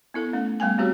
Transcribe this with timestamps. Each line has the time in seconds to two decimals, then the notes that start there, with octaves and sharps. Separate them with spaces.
0.14 B3 E4 A4
0.33 A3 C#4
0.60 G3 A3 B3 G5 G#5
0.78 G3 C4 F#4 G4 C#5